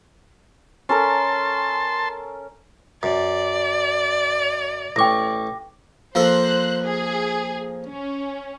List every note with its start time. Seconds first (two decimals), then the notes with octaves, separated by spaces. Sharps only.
0.89 C#4 A4 A#4 A5 C6
3.03 F#2 D5
4.96 A1 G5 C#6 D6 A#6
6.15 F3 A#3 A4 C5 F#6
6.83 G#4
7.87 C#4